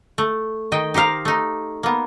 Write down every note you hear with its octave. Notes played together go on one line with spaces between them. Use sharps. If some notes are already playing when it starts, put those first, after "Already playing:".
A3
D#3 D#5 G5
D#4 G4 C5 F5 A#5
A3 D#4
A#3 B3